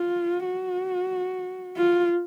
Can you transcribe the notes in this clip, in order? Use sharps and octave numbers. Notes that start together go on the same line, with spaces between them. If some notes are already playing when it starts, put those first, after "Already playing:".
Already playing: F4
F#4
F4